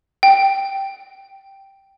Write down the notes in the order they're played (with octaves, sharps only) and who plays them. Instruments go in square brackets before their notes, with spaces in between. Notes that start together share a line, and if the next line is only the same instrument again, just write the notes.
[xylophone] G5